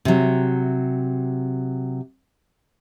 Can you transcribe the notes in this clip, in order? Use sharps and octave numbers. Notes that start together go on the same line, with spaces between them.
C3 F#3